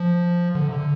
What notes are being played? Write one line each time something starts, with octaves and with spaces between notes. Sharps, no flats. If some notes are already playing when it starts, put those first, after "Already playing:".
Already playing: F3
D3
C3
D3